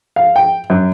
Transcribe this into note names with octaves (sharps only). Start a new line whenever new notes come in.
F5
G5
F#2